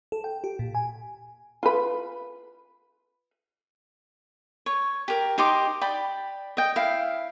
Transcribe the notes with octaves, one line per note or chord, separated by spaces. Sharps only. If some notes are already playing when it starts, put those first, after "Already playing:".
A4
G5
G4
A#2
G#5
F4 B4
C#5
G4 A#4
D#4 G4 C6 D6
D5 G5 B5
D#5 G5
E4 F5